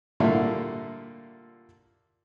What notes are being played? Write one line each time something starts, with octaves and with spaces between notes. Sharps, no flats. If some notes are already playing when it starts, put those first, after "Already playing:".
A#2 D3 G3 A3 A#3 E4